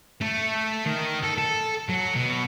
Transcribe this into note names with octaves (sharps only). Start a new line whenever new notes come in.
A3
D#3
A4
A4
F#3
B2